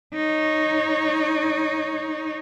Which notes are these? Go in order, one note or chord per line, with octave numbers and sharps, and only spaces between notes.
D#4 C#5